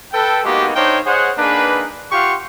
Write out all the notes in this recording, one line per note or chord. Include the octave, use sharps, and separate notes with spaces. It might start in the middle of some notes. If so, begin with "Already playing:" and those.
A4 B4 G5
G#3 A#3 B3 D#4 F#4 G4
D4 D#4 C5 C#5 F5 G5
G#4 C5 C#5 D#5 F#5
A#3 D4 D#4 G#4 B4
F4 G4 F5 F#5 C6 C#6